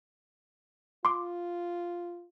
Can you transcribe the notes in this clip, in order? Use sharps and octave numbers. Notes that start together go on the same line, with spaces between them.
F4 C6 D6